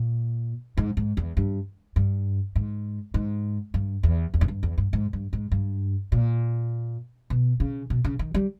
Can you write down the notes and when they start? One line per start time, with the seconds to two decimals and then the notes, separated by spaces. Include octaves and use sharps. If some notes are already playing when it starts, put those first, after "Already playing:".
Already playing: A#2
0.77 G#2
0.97 G#2
1.17 E2
1.37 G2
1.96 G2
2.56 G#2
3.14 G#2
3.74 G2
4.03 E2
4.34 E2
4.41 G#2
4.48 G2
4.63 E2
4.78 G2
4.93 G#2
5.13 G2
5.33 G#2
5.52 G2
6.12 A#2
7.30 B2
7.60 C#3
7.90 B2
8.05 C#3
8.19 D#3
8.34 G3